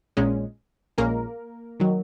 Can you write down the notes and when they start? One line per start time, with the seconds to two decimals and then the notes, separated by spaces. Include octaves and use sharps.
0.17 A#1 A#2 G#3 C#4
0.98 A#1 A#2 G#3 A#3 C#4 A#4
1.80 D#3 F#3